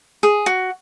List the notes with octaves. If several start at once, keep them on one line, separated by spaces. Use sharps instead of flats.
G#4
F#4